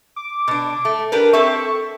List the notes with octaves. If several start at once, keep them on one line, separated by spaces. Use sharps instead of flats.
D6
B2 D4
A3
D4 G4 A#4 B4
C4 A4 E5 C#6